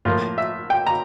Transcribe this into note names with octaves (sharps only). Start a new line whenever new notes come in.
A2 F3 A#3 F4
E5
G5
A#5